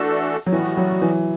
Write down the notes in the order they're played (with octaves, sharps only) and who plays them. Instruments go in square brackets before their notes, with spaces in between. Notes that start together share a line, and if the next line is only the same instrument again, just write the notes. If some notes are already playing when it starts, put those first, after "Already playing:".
Already playing: [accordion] E3 A3 D4 F#4 A4
[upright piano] F#3
[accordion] A2 G3 B3 F#4 [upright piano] E3
[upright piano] F#3
E3